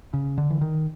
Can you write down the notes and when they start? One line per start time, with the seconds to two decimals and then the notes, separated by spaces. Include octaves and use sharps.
0.13 C#3
0.38 D3
0.50 E3
0.61 D#3